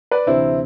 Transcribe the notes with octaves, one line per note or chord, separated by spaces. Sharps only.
B4 D5
D2 C3 E3 C4 E4